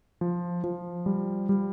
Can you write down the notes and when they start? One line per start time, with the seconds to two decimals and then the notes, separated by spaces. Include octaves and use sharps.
0.21 F3
0.64 F3
1.06 G3
1.49 G3